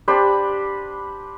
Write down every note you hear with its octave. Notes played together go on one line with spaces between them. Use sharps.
D4 G4 B4 C5